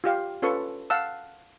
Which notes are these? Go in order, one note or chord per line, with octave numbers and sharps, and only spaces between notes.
F4 G4 F5
C#4 F4 A4 B4 C#6
F5 F#5 A5 E6